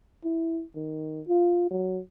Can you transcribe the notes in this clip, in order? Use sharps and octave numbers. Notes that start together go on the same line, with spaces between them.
E4
D#3
F4
F#3